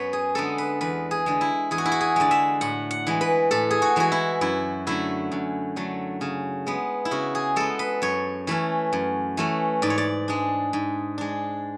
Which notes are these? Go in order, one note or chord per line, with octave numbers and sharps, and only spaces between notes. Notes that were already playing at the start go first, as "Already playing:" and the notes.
Already playing: F#2 B3 B4 C#5
G#4
D3 G#3 B3 D4 A4
B4
E2 B4
G#4
D3 G#3
E4
E2 G#4
F#4
E4
F#4
G#4
D3 G#3 D5
E5
A2 F#5
F#5
E3 G#3
B4
A2 A4
G#4
F#4
E3 G#3 F#4
E4
F#2 E4
D3 F#3 A3 E4
F#2
D3 F#3 A3
C#3
G#3 B3
E4
C#3 F#4
G#4
G#3 B3 A4
B4
F#2 C#5
E3 A3 C#4
F#2
E3 A3 C#4
G#2 D5
C#5
D5
G#3 D4
G#2
G#3 D4